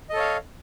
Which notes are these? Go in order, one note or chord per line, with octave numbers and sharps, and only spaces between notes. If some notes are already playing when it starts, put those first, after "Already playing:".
A4 C#5 D#5 F5